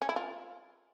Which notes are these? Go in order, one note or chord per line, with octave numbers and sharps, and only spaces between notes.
C#4
E4
F4